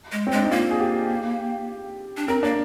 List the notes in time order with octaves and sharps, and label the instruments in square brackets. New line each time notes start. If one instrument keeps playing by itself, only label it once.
[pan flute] G#3
[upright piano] C4
[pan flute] G#3 [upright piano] D4
[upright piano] D#4
[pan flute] A#3 [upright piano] F4
[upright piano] G#4
G4
[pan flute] D4
[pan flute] C4 [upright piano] A#4
[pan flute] A#3 [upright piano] D4